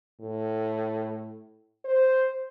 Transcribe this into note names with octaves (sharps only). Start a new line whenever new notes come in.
A2
C5